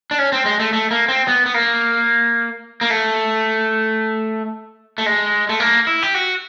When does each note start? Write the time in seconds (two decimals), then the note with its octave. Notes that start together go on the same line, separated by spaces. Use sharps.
0.11 D4
0.19 C#4
0.32 C4
0.46 G#3
0.60 A3
0.73 A3
0.91 A#3
1.09 C4
1.28 B3
1.46 B3
1.54 A#3
2.81 A#3
2.90 A3
4.98 A3
5.06 G#3
5.49 A3
5.60 A#3
5.87 E4
6.02 G4
6.14 F#4